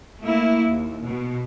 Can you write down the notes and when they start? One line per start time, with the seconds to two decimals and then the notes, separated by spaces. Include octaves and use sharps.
0.20 A3 A#3 E4
0.67 D#2
1.04 B2